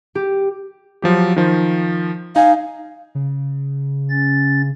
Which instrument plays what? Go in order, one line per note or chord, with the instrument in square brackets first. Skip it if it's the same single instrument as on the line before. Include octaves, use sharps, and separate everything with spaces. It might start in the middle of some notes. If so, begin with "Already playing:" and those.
[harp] G4
[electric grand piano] F3 F#3 G4
D#3 F3
[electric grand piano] D#4 G#5 [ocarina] F5
[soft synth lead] C#3
[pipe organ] C#4 A6